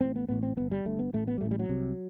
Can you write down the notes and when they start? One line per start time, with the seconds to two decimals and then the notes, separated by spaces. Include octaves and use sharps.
0.01 A1 A2 C4
0.16 B3
0.29 A1 A2 B3
0.43 C4
0.57 G1 G2 B3
0.71 G3
0.85 G1 G2 A3
0.99 B3
1.13 A1 A2 A3
1.27 B3
1.38 G3
1.41 A1 A2 A3
1.51 G3
1.59 F#3
1.69 C2 C3